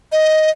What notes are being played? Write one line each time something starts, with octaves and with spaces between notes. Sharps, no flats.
D#5